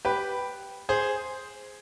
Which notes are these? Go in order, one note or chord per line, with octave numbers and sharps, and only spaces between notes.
G4 B4
G#4 C5